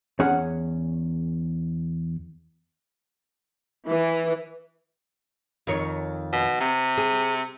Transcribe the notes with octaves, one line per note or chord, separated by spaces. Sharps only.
E2 C#4 G#4 F#5
E3
F2 D#3 C#5
B2
C3
G#4